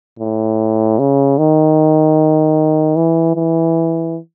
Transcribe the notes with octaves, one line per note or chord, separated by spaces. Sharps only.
A2
C#3
D#3
E3
E3